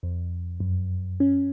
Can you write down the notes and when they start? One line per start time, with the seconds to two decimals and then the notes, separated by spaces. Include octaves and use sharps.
0.03 F2
0.60 F#2
1.20 C#4